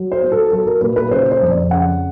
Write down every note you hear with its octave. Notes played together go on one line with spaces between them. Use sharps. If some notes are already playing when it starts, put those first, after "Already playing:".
Already playing: F#3
C5
B3
A4
F#3 A4
A#4
A#2 B4
B4
C#3 C5
C5
F2
D5
C#3 F#5